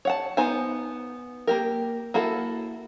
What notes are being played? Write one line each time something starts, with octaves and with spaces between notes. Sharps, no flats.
C#5 F#5 A5
B3 D#4 C5 G#5
A#3 G4 A#4
A#3 E4 F#4 A4